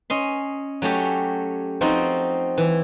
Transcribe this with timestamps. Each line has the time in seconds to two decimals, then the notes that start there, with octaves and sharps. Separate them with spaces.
0.10 C#4 D#5 C6
0.82 F#3 A3 C#4 G4
1.81 F3 C4 D#4 F#4
2.58 E3